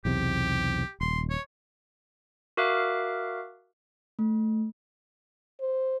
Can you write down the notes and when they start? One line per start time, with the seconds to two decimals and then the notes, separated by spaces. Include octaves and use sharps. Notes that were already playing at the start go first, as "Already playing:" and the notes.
0.05 B1 E2 C3 G4
1.01 D#1 C6
1.30 C#5
2.57 F#4 A#4 E5 F5 D6 F#6
4.19 A3
5.60 C5